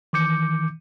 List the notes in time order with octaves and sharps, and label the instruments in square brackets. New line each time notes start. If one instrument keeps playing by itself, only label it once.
[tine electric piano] D#3 E3 D6 G6 C#7